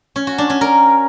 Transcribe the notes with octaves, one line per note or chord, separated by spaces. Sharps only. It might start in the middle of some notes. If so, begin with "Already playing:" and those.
C#4
F#4
D4
C#4
A#4